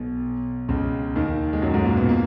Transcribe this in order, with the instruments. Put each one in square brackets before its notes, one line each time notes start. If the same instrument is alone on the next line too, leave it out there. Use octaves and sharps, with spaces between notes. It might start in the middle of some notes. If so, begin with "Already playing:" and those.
Already playing: [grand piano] B1 B2
C#2 C#3
D#2 D#3
G#3
F#2 F#3
G#2 G#3
A#2 A#3
B2 B3
A#2 A#3